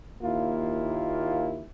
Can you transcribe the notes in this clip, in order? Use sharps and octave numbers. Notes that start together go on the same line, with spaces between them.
D#2 A#3 E4 F4